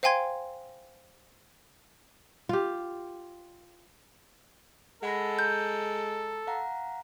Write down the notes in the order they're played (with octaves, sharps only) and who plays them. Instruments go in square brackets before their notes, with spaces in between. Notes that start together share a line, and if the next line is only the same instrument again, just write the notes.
[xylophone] C5 F5 G5 G#5 C6 G#6
[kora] F4 G4
[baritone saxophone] G#3 [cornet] A4 [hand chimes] F#5 B5 A#6
[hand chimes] A#5 [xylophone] G6
[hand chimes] F5 F#5 A#5